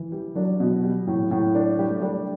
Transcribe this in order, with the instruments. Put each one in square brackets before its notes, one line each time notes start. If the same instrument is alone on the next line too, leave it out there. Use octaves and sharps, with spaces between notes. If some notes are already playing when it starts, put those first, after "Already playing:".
Already playing: [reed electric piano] E3
[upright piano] G3
[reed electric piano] F#3 [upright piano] D4
[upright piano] B2
G3
A2
A2
D4
[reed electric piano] G3 [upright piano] G4
[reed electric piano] A3
[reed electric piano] G3 [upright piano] D4